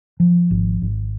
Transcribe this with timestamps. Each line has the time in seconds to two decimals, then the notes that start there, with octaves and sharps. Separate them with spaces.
0.20 F3
0.51 G#1
0.81 G#1